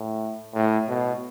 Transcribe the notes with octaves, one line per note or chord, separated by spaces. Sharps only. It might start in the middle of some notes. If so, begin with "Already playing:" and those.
Already playing: A2
A2
B2